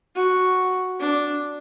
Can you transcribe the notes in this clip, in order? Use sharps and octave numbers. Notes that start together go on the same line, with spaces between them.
F#4
D4